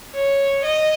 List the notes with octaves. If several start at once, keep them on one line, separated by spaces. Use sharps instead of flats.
C#5
D#5